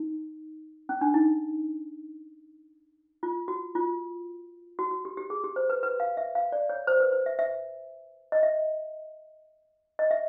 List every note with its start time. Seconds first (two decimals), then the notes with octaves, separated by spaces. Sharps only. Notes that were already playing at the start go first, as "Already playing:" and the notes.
Already playing: D#4
0.89 C#4
1.01 D4
1.14 D#4
3.23 F4
3.48 F#4
3.75 F4
4.79 F#4
4.91 F#4
5.05 G4
5.17 G4
5.30 G#4
5.44 G4
5.56 C5
5.70 B4
5.83 B4
6.00 F5
6.17 E5
6.35 F5
6.52 D5
6.69 C#5
6.87 C5
7.00 B4
7.12 C5
7.26 E5
7.39 E5
8.32 D#5
8.43 E5
9.99 D#5
10.11 E5